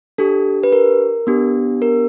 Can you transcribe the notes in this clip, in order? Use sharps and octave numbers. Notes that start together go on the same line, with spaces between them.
D4 G4 A4
B4
A#4
B3 D4 G4
A#4